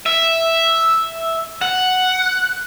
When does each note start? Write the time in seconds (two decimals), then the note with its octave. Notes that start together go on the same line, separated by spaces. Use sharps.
0.06 E5
1.61 F#5